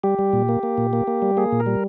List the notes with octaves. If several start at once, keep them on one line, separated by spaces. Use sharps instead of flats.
G3 G4
G3
A#2
A#3
A#3
A#2
A#3
A#3
G3
A#3 G#4
A#2
A#4
G3